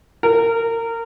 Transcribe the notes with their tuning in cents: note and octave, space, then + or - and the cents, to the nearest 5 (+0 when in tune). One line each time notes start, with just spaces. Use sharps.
A#4 -25